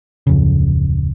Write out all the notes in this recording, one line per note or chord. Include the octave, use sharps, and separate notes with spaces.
D1 F2 C#3